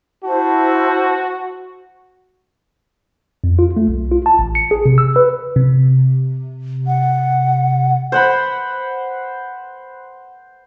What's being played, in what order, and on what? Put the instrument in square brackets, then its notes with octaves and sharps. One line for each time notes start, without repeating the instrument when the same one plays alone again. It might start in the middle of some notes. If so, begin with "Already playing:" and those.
[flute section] E4 C5 A5 [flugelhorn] F#4
[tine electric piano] F2
F4
A3
B1
F4
A5
A1
C#7
G#4
C3
E6
B4
[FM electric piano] C3
[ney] F#5
[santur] C5 F#5 B5